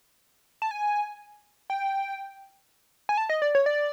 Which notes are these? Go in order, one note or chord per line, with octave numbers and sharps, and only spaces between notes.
A5
G#5
G5
G#5
A5
D#5
D5
C#5
D5